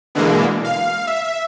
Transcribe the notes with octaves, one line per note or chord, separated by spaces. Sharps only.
B2 D3 E3 G#3 A#3
F5
E5